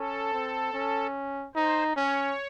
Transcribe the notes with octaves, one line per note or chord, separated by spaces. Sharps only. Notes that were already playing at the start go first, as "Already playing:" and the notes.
Already playing: C#4 A4
C4
C#4
D#4 C5
C#4 C#5